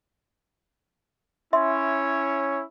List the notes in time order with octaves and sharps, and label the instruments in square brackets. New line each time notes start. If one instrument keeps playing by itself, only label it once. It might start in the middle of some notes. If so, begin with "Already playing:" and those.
[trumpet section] C#4 E4 C#5 [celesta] E5 C6